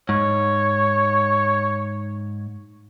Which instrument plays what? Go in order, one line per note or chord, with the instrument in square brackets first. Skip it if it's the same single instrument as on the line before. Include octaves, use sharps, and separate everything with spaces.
[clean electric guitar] G#2 [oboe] C#5